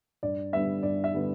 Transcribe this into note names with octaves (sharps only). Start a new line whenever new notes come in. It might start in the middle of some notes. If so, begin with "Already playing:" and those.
G2 D5
D3 G3 B3 E5
G2 D5
E5
D3 G3 B3